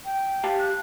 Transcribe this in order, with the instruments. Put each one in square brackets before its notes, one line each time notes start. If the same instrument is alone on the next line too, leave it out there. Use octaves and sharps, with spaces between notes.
[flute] G5
[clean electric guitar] G4 F5 A5
[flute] F#6